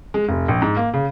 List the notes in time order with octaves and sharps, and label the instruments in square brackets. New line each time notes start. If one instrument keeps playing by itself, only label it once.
[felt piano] G#3
F1
A#1
G#2
A#3
C#3